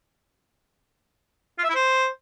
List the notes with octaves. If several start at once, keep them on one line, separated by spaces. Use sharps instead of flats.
F4
E5
E4
C5